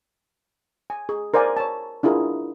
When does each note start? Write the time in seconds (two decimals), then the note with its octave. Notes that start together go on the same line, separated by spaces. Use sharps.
0.90 G#5
1.09 G#4
1.34 A#4 C5 D5 F5 G#5
1.57 C#5 A5
2.03 D4 E4 F4 G#4 A#4